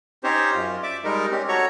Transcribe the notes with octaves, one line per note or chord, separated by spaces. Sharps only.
C4 C#4 D#4 G4 C5 C#5
F#2 F4
D5 E5 D6
G3 G#3 D#4 A#4
C4 C#4 G4
F#4 A4 C#5 A#5 C#6